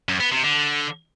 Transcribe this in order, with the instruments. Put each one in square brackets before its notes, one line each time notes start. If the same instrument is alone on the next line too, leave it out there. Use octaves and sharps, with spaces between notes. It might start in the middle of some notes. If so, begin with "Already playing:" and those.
[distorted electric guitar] F#2
B3
C3
D3